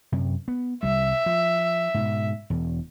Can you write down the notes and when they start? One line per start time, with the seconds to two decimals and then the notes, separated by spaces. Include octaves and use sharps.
0.12 F#2 C3
0.48 B3
0.83 C2 G3 E5
1.26 F3
1.94 G#2 B2
2.50 E1 E2